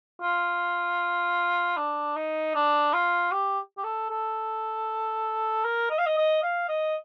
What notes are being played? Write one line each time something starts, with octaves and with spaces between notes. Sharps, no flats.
F4
D4
D#4
D4
F4
G4
G4
A4
A4
A#4
D#5
F5
D#5
D#5
F5
D#5